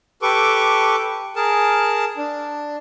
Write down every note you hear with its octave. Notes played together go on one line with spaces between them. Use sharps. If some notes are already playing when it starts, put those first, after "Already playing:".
G4 A4 B4 C#6 D6
G#4 A#4 A5
D4